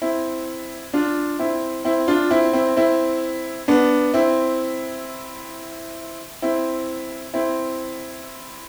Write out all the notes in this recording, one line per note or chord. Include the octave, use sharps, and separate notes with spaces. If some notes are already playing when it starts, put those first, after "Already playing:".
C4 E4
D4 F4
C4 E4
C4 E4
D4 F4
C4 E4
C4 E4
C4 E4
B3 D4
C4 E4
C4 E4
C4 E4